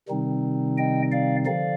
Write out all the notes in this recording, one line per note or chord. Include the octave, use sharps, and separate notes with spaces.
C3 D#3 G3 C4 D#4
D#5 G5
D5 F5
D3 F3 D5 F5